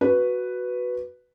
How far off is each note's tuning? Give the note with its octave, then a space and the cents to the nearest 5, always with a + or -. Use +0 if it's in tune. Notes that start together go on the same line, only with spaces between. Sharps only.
F#4 +0 B4 +0